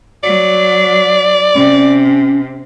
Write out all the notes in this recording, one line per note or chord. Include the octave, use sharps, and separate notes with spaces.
F#3 D5
C3 C#4